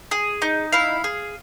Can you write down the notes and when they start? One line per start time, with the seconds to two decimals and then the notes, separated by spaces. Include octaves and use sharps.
0.11 G#4
0.42 D#4
0.72 E4 F5
1.04 G#4